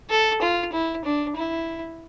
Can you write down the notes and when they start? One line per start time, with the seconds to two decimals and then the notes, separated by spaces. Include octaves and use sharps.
0.10 A4
0.41 F4
0.73 E4
1.05 D4
1.36 E4